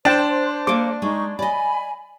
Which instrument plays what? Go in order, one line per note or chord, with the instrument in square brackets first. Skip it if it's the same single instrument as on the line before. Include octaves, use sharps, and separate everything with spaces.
[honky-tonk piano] D4 [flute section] C5 [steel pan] G5 A5
[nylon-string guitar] A#3 A4 [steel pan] D6
[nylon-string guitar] G#3 [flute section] D#4 C#6
[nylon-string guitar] D5 D#5 [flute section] G#5 B5